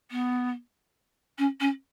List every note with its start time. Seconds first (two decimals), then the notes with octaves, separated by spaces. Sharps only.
0.11 B3
1.38 C#4
1.60 C#4